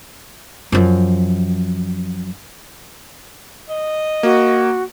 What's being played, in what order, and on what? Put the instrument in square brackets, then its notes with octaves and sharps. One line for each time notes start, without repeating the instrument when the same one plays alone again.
[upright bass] F#2 F3
[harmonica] D#5
[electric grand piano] A#3 [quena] F#4